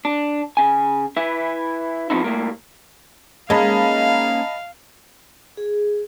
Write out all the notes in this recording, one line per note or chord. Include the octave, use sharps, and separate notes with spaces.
D4
C#3 G#5
E4 B4 E5
F3 F#3 B3 C4 D#4 E4
A2 F#3 G3 A3 A#3
G#3 A#3 C#4 D#4 D#5 F5 A5 B5
G#4